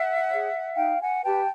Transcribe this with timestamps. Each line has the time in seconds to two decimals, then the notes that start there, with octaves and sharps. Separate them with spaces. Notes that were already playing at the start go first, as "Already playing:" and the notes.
Already playing: E5 F#5
0.31 G#4 C#5
0.77 D#4 F5 G5
1.00 F#5 G#5
1.24 G4 B4 G5 A5